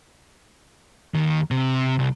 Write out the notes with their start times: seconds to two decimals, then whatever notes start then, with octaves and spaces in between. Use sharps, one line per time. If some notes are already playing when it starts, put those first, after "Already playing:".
1.14 D#2 D#3
1.51 C3
1.99 C2